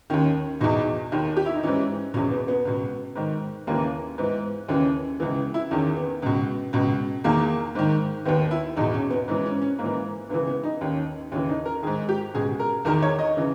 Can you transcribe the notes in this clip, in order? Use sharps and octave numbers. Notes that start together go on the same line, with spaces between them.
D#2 D#3 C#4
E2 B2 D#4
D#2 D#3
G4
E4
D#4
G#2 E3 C#4
E2 B2 C#4
B3
B3
C#2 B2
G#2 D#3
D#2 C#3 E3 A#3
G#2 E3 B3
D#2 C#3 E3 C#4
C#2 C#3 E3 B3
E4
E2 D#3 C#4
B3
C#2 B2
C#2 B2
E2 D#3 A#3
G#2 D#3
D#2 D#3 B3
E4
E2 B2 D#4
C#4
B3
G#2 E3 C#4
C#4
C#4
G#2 A#3
E3
C#2 C#3 E3 B3
B3
D#4
D#2 D#3 C#4
D#2 C#3 E3 C#4
D#4
A#4
G#2 D#3 G#4
G4
C#2 B2 G#4
A#4
E2 D#3 A#4
C#5
D#5
C#3 E3